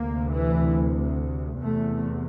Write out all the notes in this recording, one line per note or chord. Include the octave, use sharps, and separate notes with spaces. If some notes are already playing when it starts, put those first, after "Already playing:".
Already playing: D2 C3 A#3
E3
E2 C3 A3